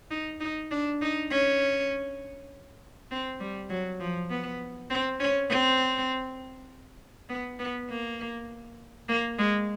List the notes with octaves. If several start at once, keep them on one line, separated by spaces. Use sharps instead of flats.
D#4
D#4
D4
D#4
C#4
C4
G3
F#3
F3
B3
C4
C#4
C4
B3
B3
A#3
A#3
G#3